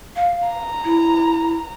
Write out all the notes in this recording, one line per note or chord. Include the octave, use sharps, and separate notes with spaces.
F5
A#5
E4